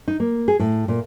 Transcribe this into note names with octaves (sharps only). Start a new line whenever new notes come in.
D#4
A#3
G#4
A2
A#2